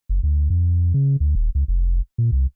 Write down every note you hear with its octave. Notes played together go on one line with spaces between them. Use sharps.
F#1
D2
F2
C#3
D2
D#1
C#2
F1
A#2
C2